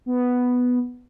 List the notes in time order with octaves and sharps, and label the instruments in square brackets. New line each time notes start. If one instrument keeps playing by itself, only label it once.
[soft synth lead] B3